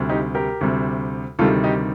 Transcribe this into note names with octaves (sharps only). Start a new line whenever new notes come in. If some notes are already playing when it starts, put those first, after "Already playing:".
Already playing: D2 C3 G3
D#4 G4
G4 A#4
D2 C3 G3
D2 C3 D#3 G3 F4 A4
D#4 G4